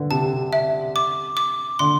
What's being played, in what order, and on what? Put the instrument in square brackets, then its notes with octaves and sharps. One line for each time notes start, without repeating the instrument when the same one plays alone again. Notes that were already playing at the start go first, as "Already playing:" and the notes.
Already playing: [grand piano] D3 [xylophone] B4
[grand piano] C3 [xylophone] A5
[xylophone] E5
D6
D6
[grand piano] D3 [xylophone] C6